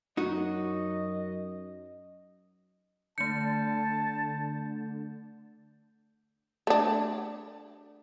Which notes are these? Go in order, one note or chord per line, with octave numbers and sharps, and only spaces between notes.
F#2 D#4 F#4 D#5
D3 A3 A5 G6 C#7
A3 D4